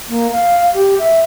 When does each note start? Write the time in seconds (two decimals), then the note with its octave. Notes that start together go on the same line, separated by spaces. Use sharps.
0.09 A#3
0.32 F5
0.74 G4
0.99 E5